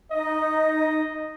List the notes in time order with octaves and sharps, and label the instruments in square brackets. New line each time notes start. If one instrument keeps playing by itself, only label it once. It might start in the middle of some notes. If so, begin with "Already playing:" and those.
[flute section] D#4 [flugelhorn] D#5